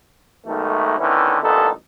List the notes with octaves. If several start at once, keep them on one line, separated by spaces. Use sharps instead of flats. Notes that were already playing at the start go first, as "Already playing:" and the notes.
B1 G#2 D#3 A3
D3 D#3 B3 C#4 E4
A1 G2 A#2 B3 D#4 A4